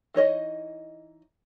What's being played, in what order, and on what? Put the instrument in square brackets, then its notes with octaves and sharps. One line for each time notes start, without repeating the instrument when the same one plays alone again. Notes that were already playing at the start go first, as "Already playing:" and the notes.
[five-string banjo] E3 D#4 C#5 D#5